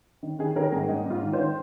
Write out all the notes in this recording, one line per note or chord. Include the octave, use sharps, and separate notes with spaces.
D#3
D#3 G#4
D#3 A#4
G#2 G#4
G#2 D#4
G#2 F4
D#3
C5
D#3